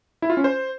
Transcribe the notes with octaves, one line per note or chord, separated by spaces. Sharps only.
E4
F4
C#4
C5